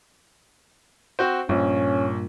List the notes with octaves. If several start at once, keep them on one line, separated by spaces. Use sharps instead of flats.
C4 F#4 C5
A#1 G2 A#2 C#4